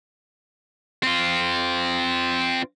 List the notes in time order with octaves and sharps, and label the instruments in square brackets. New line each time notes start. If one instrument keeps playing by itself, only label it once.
[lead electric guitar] C4 F4